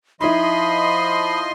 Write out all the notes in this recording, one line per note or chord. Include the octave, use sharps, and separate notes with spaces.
F3 D#4 E4 D#5 B5 C6